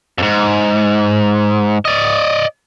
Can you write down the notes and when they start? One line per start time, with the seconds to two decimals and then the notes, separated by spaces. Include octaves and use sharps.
0.18 F2 G#2
1.85 D5 D#5